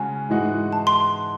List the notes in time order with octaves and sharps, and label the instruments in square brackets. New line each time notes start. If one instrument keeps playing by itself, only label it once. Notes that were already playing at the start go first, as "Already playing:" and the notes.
Already playing: [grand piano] C#3 G#3 C#4 F#4 [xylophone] G#5
[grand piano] G#2 E3 G#3 D#4 F#4
[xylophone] A5
C6